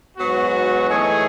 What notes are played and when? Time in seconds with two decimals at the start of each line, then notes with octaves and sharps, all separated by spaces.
0.17 G#2 F#3 B3 F#4
0.87 E3 A3 D#4 G#4 C#5